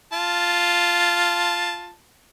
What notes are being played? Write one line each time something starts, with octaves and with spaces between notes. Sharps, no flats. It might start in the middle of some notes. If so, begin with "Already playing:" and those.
F4 A5